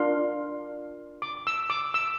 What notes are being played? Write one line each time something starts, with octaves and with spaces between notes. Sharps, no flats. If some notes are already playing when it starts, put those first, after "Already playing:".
Already playing: D4 F4 A#4 C6
D6
E6
D6
E6